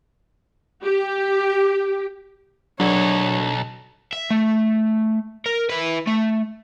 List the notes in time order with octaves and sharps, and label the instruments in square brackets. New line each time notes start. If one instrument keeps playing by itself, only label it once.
[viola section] G4
[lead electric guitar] B1 [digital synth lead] F#3 [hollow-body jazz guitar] D4 G#4 A#4 [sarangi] C#5
[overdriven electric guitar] E5
A3
A#4
E4 B4
A3